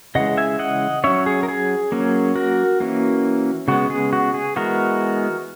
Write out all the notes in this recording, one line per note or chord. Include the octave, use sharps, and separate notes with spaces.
C#3 E3 G#3 D#5 F#5
E5 G#5
D#5 F#5
F#3 C#4 C#5 E5
G#4
A#4
G#4
F#3 A#3 C#4
F#4 A#4
E3 A#3 C#4
C#3 G#3 B3 F#4
G#4
F#4
G#4
E3 G#3 B3 F#4 A#4